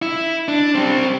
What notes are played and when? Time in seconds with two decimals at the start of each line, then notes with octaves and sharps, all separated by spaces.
0.02 E4
0.48 D4
0.75 G3 C4